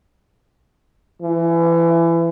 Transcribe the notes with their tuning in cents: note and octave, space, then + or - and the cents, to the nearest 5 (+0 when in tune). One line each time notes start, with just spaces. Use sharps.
E3 +25